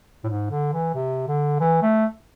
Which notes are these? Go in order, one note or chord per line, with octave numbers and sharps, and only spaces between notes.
A2
G#2
D3
E3
C3
D3
E3
A3